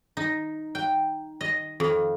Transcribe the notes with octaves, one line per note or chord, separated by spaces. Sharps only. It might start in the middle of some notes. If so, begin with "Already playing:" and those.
D#4
G5
D#5
F2